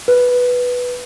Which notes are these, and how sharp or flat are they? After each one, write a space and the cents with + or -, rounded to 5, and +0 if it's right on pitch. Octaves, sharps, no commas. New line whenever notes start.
B4 -5